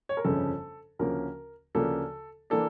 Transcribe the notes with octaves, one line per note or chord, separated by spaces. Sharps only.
C#5
A#4
G1 F2 C#3 F3 C#4 A4
D2 C#3 F3 A#3 C#4 A#4
D2 C#3 F3 A#3 D4 A4
E3 A#3 D4 A4